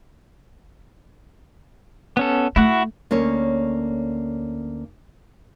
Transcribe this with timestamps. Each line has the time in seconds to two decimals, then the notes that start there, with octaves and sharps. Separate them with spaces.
2.17 B3 C#4 A4
2.56 A3 E4 F#4 F#5
3.11 D2 A#3 C#4 C#5